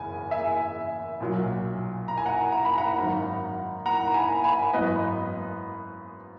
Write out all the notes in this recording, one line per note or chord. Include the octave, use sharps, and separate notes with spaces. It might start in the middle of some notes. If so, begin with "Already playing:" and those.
Already playing: F#1 E2 C#3 G#5
E5 G#5
B1 A#2 F#3
A#5
G#5
F#5 A#5
A#5
B5
F#5 A#5
G#1 F#2 D#3
F#5 A#5
A#5
G#5 B5
G#5 B5
G#1 F#2 E3 B3 B4 D#5